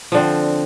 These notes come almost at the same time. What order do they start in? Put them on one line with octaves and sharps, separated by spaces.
F3 D3 C4